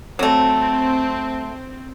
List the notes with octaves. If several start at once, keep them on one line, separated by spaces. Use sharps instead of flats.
F#3 A3 C4